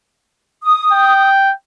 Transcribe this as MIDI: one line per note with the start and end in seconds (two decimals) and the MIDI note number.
0.63 1.29 87
0.92 1.52 79